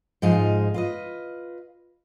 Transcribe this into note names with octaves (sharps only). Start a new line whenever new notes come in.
G#2 F3 G#3 D#4 F4 G#4
F4 B4 D#5